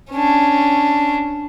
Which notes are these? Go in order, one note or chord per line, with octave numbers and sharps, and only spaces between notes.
C#4 D4